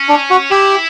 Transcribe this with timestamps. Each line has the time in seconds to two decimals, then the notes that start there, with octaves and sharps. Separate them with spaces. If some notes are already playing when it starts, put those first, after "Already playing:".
Already playing: C#4
0.09 D4
0.30 F#4
0.51 E4 G4